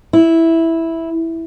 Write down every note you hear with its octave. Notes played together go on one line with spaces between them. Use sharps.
E4